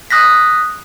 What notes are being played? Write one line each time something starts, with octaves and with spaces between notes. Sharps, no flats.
D#6 F#6 A#6 B6